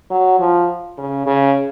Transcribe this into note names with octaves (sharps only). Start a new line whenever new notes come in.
F#3
F3
C#3
C#3